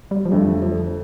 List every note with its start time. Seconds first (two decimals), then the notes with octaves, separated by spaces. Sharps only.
0.11 G3
0.25 F3
0.31 F2 D3 G3 A3
0.62 F3